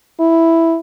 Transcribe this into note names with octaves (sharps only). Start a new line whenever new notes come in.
E4